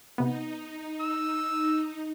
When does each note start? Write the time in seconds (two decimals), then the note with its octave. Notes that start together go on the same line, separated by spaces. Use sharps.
0.18 C3 B3 D#4
1.02 E6